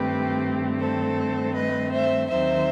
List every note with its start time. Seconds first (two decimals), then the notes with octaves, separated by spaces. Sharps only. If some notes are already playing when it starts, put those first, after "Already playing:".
Already playing: G2 D#3 A3 C4 G4 B4
0.79 A4 C5
1.54 B4 D#5
1.92 C5 E5
2.29 D#2 D#3 F#3 C4 D#4 C5 E5